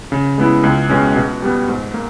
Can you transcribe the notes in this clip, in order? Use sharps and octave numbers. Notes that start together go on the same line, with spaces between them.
C#3
G#3 B3 E4
C#2
B2 G#3 C#4
B2
G3 B3
G#2
A#3